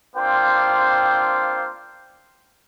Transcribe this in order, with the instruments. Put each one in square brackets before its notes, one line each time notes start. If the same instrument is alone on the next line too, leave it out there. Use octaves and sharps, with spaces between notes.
[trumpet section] A#3 C4 D4 F4 C5 G5